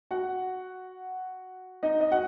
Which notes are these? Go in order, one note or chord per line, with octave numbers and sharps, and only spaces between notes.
F#4 F#5
D#4 D#5
D#5
F#4 F#5